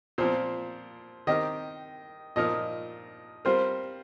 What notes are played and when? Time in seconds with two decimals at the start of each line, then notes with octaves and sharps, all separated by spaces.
0.18 A#2 F3 C4 C5
1.27 D#3 C4 G4 A#4 D#5
2.36 A#2 F3 D#4 A#4 D#5
3.45 G3 C4 F4 A#4 C5